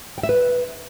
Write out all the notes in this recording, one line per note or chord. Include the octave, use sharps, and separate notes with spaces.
G5
E5
B4